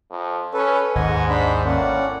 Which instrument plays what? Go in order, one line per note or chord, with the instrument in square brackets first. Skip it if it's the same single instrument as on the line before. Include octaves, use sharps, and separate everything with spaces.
[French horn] F2
[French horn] C#4 [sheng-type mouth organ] A4 B4
[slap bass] G#1 D#2 [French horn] G#2 [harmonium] D#5 F#5 [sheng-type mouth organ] G#5
[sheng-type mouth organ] D4 B5 [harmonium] C5
[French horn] A2 [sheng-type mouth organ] A#3 [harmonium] C#4 D5 F#5